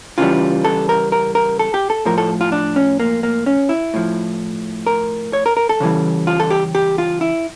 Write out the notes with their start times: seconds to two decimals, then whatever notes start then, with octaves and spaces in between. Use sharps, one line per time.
0.18 C#3 E3 G3 F4
0.65 A4
0.89 A#4
1.12 A#4
1.35 A#4
1.59 A4
1.74 G4
1.90 A4
2.05 A2 F3 A#4
2.18 A4
2.41 F4
2.52 D4
2.76 C#4
3.00 A#3
3.23 A#3
3.46 C#4
3.69 E4
3.94 A2 F3
4.87 A#4
5.33 C#5
5.46 A#4
5.57 A#4
5.69 A4
5.80 C#3 E3 G3
6.27 F4
6.40 A4
6.50 G4
6.75 G4
6.98 F4
7.21 E4